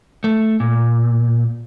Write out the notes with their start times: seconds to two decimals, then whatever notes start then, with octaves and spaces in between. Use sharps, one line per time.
0.24 A3
0.60 A#2